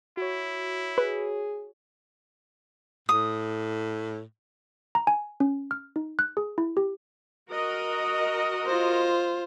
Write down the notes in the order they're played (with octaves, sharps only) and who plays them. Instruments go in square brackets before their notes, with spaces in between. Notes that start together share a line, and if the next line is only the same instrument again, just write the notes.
[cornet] E4 [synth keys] F#4 C#5
[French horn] G#4 [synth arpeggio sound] B4
[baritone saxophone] A2 [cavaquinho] D#6
[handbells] A#5
G#5
C#4
F6
D#4
F#6
G#4
E4
G4
[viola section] F#4 A#4 D#5
[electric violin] F4 C5